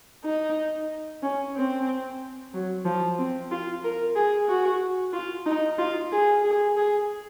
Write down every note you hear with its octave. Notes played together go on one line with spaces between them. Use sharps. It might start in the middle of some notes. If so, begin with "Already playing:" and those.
D#4
C#4
C4
F#3
F3
C4
F4
A#4
G#4
F#4
F4
D#4
F4
G#4
G#4
G#4